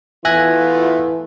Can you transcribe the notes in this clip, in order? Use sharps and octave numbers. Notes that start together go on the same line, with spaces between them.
E3 A3 B3 F4 E5 G#5 F#6 A#6